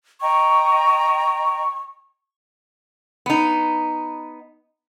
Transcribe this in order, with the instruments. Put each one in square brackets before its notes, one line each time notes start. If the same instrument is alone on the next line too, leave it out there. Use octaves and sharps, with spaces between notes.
[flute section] D#5 G5 A#5 [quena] C#6
[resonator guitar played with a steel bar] B3 D#4